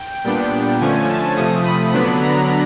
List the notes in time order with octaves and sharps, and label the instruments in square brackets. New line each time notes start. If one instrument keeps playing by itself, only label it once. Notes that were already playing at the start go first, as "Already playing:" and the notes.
Already playing: [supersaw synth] G5
A#2 G3 B3 D4 G5
D3 F3 A3 C#4 G#5
A5
C3 F3 A3 D#6
B5
D3 F#3 B3 D4 B5
A#5